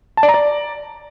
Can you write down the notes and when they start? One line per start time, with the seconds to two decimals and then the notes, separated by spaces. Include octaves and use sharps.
0.17 A5
0.23 D5
0.29 A#5
0.34 D5